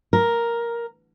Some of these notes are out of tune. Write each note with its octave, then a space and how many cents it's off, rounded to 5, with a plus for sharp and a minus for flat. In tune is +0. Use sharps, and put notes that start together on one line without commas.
A#4 +5